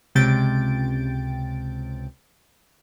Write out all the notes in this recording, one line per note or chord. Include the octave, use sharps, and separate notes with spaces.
C#2 C3 G5 A6 D7